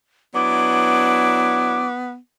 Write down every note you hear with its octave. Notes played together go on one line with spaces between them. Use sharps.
F#3 B3 D4 E4 D6